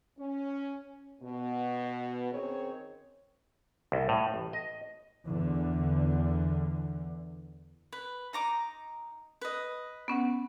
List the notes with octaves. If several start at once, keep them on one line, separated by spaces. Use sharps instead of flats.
C#4
B2
D#3 C4 C#4 G#4 C#5
C2
A2
A1
D#5
E2 D3
B4
D#4 A#5 D6
B4 D#5
B3 C#4 F#5